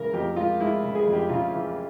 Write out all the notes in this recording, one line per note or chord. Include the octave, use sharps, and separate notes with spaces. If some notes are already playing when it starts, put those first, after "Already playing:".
Already playing: C#3 E3 G#3 A#4
F2 G4
G#3 F4
G#3 E4
C#3
G#4
F2
G4
C#3 F4
E3